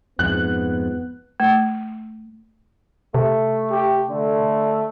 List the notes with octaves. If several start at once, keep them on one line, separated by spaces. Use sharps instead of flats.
F2 G#2 B3 F#6
A3
C3 A3
G4
D3 A3